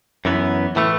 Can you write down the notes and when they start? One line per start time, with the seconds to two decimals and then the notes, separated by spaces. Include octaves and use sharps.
0.25 F#2 E3 B3
0.76 A2 E3 A3